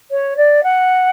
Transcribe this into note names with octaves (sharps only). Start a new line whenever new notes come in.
C#5
D5
F#5